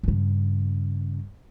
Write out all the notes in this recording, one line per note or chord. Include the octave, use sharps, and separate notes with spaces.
G2 C#3